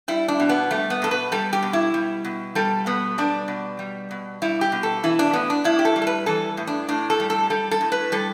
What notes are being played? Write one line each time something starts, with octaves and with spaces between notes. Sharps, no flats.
G3 E4
D4
B2
B3
G3 A3
B3
B2 A4
B4
G3 A4
G4
B2
E4
G3
B2
G3 A4
B2 B3
G3 D4
B2
G3
B2
G3 E4
G4
B2
A4
E3 E4
D4
A2 B3
D4
A2 E4
G4
A4
G3
A4
B4
E3 A4
A2
D4
A2 D4
A4
G3
A4
G3 A4
A4
A2
B4
G3 A4